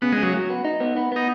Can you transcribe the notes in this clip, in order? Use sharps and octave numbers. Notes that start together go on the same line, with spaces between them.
C#3 B3
C#3 G#3
F#3
F#3
B3
D#4
B3
B3
B3 D#4